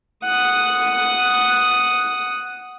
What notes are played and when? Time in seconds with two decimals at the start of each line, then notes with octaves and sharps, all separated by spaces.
0.24 F#5 D#6